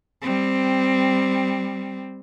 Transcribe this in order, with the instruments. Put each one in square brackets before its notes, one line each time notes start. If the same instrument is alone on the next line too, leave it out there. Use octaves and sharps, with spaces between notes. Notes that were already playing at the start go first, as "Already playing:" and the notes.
[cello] G3 C4